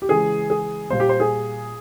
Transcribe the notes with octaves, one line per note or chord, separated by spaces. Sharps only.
G4
C#3 E3 G#3 G#4
G#4
A#2 G3 A#3 C5
G4
C5
G#4